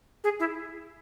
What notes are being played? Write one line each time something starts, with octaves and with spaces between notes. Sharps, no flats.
G#4
E4